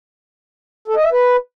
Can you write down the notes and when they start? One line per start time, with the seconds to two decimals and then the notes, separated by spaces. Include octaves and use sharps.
0.88 A4
0.96 D#5
1.04 E5
1.12 B4